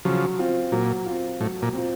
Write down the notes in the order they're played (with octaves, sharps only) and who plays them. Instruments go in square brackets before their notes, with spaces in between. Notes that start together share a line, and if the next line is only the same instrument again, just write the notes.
[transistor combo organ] C#3 F3 [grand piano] F#3
[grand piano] C4 F4
[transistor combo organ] A#2 [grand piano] F#3
[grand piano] C4 F4
[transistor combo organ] A2 [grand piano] F#3
[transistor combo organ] A#2
[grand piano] C4 F4